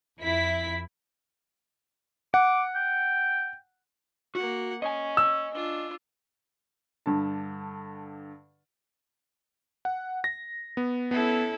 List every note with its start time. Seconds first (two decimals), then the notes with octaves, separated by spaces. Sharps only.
0.20 F2 E4 B6
2.34 F#5 D6
2.75 G5
4.35 A#3 F#4 F#5
4.82 C#4 D#5 G#5
5.17 E6
5.54 D4 F4
7.06 G2 D3 A5
9.85 F#5
10.24 A#6
10.77 B3
11.11 B3 C#4 E4 A4